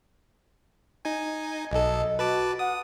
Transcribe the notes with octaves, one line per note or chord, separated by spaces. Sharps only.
D#4 G#5
B1 A4 D#5
F#4 B4 A5 D6
F#5 D#6